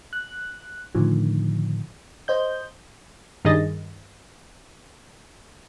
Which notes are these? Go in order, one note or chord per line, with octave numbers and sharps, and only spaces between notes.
F#6
A2 D3 D#3 F3
C5 D#5 G6
G2 D#3 G#4 D#5 A6